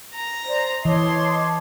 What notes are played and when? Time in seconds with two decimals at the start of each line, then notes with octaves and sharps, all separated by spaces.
0.15 A#5
0.45 C5 D5
0.85 E3 C#5 D#5 A5 C6 D6